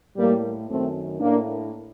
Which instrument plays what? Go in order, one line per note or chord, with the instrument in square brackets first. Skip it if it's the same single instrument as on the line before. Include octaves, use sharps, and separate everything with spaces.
[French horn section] A2 G3 A#3
F#2 D#3 A3 C4
A2 A#3 D4